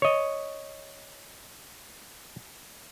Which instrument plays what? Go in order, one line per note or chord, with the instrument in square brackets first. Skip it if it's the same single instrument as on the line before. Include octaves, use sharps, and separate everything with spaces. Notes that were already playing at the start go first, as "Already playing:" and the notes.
[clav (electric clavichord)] C#5 D#5